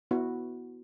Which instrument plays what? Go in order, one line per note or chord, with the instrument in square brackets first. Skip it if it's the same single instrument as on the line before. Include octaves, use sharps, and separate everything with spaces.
[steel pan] B3 E4 F#4